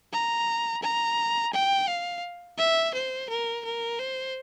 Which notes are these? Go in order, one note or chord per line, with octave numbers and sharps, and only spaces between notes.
A#5
A#5
G5
F5
E5
C5
A#4
A#4
C5